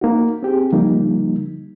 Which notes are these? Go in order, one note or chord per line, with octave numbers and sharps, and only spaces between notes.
A#3 D#4 F#4
C4 G4 G#4
D3 F3 G3 A#3 D#4